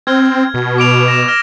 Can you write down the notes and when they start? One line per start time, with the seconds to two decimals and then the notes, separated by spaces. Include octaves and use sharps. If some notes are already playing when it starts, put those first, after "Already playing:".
0.07 C4 F6 G#6
0.54 B2
0.78 D6 D7 F7
1.08 A#6 E7
1.28 F6 A#6